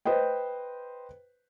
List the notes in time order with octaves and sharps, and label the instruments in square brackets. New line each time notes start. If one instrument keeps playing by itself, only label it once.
[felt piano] B4 C5 D#5 G5